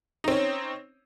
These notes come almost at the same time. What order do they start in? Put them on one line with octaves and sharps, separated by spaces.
D#4 C4 C#4